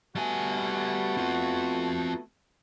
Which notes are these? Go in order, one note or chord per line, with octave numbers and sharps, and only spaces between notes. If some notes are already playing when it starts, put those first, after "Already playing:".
G3 A3 B3 F#4 G#5
C4 F4